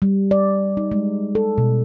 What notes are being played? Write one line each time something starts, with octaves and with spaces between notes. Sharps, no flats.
G3
D5
D#4
G#3
A4
B2